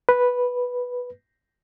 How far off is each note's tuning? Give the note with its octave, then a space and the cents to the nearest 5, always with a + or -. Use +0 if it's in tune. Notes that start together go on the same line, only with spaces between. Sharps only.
B4 -5